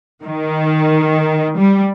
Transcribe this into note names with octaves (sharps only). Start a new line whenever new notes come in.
D#3
G3